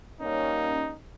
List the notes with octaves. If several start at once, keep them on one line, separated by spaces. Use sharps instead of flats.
G3 A#3 C#4 D#4